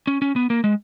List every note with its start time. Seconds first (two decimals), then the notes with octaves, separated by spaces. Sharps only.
0.07 C#4
0.22 C#4
0.36 B3
0.50 A#3
0.64 G#3